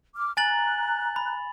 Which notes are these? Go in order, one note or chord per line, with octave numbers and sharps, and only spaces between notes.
D6 F6
G#5 A#5 F#6 A6 F#7
B5